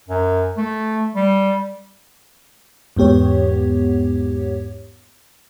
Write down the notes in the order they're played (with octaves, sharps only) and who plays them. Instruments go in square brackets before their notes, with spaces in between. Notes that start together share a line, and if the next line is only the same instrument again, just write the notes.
[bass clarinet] F#2
A3
G3
[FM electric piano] E2 G#2 B3 G4 C#5